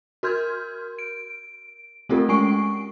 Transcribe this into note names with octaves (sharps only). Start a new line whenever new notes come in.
F#4 A#4 C6 F6 G6 G#6
D7
A3 C4 F4 G4 A4 A#4
G#3 C#4 G#5 C#6 C7 D7